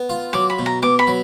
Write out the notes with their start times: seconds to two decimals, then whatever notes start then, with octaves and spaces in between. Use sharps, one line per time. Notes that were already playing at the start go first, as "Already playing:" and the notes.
Already playing: B3
0.09 F4
0.33 F#3 D6
0.50 B5
0.59 B2
0.66 A#5
0.82 B2 D6
0.99 B5
1.07 F#3